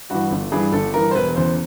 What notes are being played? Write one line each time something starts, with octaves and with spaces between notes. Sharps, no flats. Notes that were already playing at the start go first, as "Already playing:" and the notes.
G2 E3 F#4
G1
G2 E3 G#4
G1 A4
G2 E3 A#4
C5
E1 B4
E2 C#3 C5